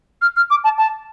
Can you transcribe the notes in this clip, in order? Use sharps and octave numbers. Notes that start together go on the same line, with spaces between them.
F6
F6
D6
A5
A5